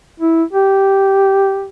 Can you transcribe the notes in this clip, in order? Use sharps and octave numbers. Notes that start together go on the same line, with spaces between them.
E4
G4